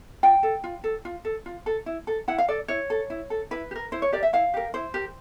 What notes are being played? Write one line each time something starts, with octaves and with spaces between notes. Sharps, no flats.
F4 G5
A4
F4
A4
F4
A4
F4
A4
E4
A4
E4 F#5
F5
A4 D5
E4 C#5
A4
E4
A4
E4 B4
G4
A#4
E4 C5
C#5
G4 A#4 D5
E5
E4 F5
G4 A#4
E4 C5
G4 A#4